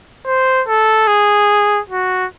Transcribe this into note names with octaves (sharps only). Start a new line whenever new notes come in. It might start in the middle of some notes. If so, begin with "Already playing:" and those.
C5
A4
G#4
F#4